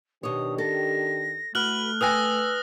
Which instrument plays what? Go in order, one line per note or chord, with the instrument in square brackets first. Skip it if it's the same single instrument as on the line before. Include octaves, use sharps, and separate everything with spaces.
[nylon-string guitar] B2 C#5 [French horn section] D#3 D4 G4 [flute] D#6
[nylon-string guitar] A4 [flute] A#6
[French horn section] A3 [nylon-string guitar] F#4 [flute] B4 [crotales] F6 F#6 F#7
[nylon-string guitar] B4 G5 G#5 [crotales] D#6 F#6 A#6 [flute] E6